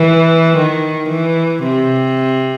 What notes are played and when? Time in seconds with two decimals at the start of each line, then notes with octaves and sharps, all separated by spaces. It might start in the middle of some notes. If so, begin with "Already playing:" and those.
Already playing: E3
0.57 D#3
1.10 E3
1.63 C3